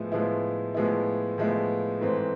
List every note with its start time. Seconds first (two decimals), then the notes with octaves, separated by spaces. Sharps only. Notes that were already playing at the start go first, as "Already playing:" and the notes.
Already playing: A2 F3 G#3 B3 E4
0.12 A2 F3 G#3 B3 E4
0.74 A2 F3 G#3 B3 E4
1.38 A2 F3 G#3 B3 E4
2.01 G#2 E3 A3 C4